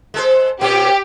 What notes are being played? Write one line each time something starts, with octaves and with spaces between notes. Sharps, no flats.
G#3 A4 C5
A#2 C4 C#4 G4